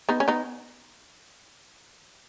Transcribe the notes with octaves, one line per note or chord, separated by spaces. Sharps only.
B3 D#4
C#4
B3 D#4